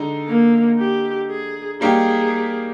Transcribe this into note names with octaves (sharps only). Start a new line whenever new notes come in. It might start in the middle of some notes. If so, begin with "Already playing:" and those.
Already playing: D3 G#3 D#4
A#3
G4
G#4
G3 A#3 D#4 G4 G#4